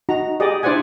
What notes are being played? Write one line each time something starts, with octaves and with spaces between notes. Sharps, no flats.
D#4 F#4 A#5
G4 G#4 D5 D#5
D4 E4 C5 D5 F#5 G#5